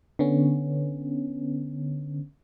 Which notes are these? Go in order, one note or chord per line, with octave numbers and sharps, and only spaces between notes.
D3 B3 C#4